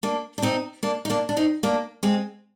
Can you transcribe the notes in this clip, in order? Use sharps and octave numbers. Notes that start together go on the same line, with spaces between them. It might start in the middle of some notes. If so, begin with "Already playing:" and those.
A#3 D4
D4
C4 D#4
A#3 D4
D#4
A#3 D4
D4
C4 D#4
A#3 D4
G#3 C4